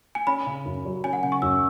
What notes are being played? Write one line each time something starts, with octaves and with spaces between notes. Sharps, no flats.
G#5
C#4 B5
C#3
F#2
F#3
C#4 G#5
F#5
C#3 G#5
C#6
F#2 E6